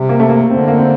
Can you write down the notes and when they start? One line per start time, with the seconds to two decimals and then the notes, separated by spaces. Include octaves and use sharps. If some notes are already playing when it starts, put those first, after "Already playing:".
Already playing: C3 G3
0.09 A#3
0.20 A3
0.29 A#3
0.50 D3 C4
0.68 A#3
0.78 C4